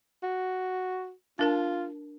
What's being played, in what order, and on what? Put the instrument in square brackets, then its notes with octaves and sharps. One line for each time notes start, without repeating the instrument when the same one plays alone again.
[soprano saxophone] F#4
[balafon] D4 A#4 A5 [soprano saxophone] F4